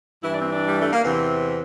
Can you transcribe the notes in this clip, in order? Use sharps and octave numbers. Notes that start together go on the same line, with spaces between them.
G2 E3 E4
D4
C4
D4
G3
A3
A#3
E2 C3 E3 C4